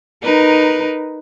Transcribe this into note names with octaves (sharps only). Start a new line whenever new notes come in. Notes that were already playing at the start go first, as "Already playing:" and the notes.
D#4 A#4 B4